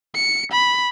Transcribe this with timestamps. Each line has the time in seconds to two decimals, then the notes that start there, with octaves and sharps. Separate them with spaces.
0.15 C#7
0.52 B5